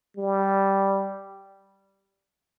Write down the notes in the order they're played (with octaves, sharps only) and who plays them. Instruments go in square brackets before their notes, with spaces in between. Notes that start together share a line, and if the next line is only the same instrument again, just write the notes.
[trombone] G3